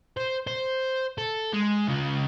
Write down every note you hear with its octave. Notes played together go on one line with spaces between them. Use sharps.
C5
C5
A4
G#3
C#3 F4